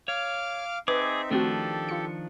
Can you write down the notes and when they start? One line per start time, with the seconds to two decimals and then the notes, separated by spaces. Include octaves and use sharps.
0.08 C#5 F5 D6 F6
0.88 C4 D#4 G#4 B4 E5 D6
1.31 D#3 F3 A3 C4 D4 F#4 G4 A4
1.89 F4 C#7